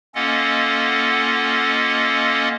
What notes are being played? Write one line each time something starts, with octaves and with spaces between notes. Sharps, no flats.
A#3 C#4 F4 A4 D#5 F#5